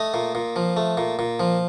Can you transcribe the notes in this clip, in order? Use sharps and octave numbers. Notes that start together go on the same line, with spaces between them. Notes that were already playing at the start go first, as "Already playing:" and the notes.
Already playing: A3 D#5
A#2
A#2
F3
A3
A#2
A#2
F3